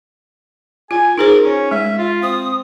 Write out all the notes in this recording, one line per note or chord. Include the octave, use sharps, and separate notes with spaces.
F4 G#5
D#4 G#4 A#4 C5
C#4
G#3 E5
F4
C4 D#6